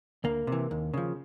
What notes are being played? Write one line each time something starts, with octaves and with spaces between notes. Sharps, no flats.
D2 A#3
C3 E3
D#2
C#3 F3